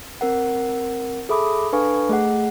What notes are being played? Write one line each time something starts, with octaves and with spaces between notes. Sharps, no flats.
C4 A#4 F#5
G#4 A4 E5 B5 D6 D#6
D4 A4 B4 F5 G#5 C#6
A3 G#4 F#5